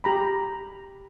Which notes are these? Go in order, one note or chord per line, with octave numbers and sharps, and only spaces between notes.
G4 A#5 B5